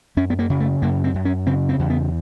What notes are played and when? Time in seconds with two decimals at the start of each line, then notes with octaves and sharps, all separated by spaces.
0.17 F#2 C#4
0.30 B3
0.39 A#3
0.50 C#3
0.60 A3
0.82 F#2 A#3
1.04 C4
1.14 F#2
1.25 C#4
1.47 C#3 C4
1.69 C4
1.79 E2
1.90 B3